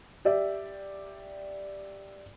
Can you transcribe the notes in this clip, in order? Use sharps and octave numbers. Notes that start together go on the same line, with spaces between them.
G4 D5 E5